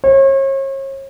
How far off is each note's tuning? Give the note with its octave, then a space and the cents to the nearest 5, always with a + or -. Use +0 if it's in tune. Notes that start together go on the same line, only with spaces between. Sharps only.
C#5 -40